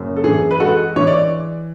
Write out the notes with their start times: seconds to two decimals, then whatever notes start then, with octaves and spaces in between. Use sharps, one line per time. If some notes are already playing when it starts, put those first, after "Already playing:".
Already playing: F#1 F#2
0.16 A4
0.24 E3 G#4
0.51 B4
0.60 G#3 F#4 A4
0.96 E3 C#5
1.07 D5